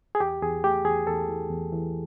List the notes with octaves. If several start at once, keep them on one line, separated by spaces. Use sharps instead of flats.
G#4
E2 G4
E2 G#4
A3 G4
E2 G#4
E2 A4
E3
E2
E3